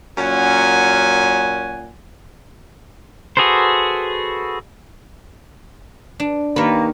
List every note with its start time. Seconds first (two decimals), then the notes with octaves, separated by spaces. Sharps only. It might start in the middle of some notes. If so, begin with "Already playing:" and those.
0.18 F#2 A#2 C#4 F#5 G#5
3.37 F#4 G#4 A4 B4 C5
6.20 D4
6.56 D#2 D#3 A#3 B4